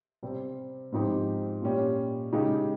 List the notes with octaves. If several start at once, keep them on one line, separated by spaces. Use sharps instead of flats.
C3 G3 C4
G#2 F3 C4 D#4 G4
A#2 G3 C#4 G4
C#3 G#3 D#4 G4